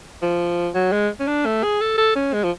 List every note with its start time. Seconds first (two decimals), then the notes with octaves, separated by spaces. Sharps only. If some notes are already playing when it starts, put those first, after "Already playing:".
0.22 F3
0.74 F#3
0.92 G#3
1.20 C#4
1.27 D4
1.46 A3
1.63 G#4
1.81 A4
1.98 A4
2.16 C#4
2.33 G#3
2.43 F3